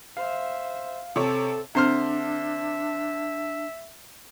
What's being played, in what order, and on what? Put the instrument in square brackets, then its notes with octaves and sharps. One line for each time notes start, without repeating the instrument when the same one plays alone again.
[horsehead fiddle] C5 E5 [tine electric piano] F5
[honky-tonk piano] C3 C#5 [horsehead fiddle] C4 A5 [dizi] A4
[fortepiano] D3 C5 F6 [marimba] C4 [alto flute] D4 [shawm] E5